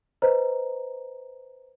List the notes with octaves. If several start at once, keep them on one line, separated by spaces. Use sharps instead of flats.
B4 C5 D#5 A#5